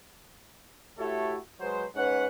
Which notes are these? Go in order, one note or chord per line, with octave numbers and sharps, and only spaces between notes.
A3 E4 F#4 G4 A4 C#5
F#3 G#3 B4 C5
G#2 C#4 B4 C#5 F#5